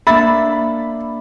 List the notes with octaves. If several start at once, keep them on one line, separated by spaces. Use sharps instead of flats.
A#3 D4 E5 B5 A6